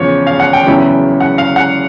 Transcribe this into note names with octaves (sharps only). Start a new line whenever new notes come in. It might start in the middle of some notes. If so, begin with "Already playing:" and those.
Already playing: E2 C#3 F3 C#5
F5
F#5
G5
E2 C#3 F#3 B3 E4
F#5
F5
F#5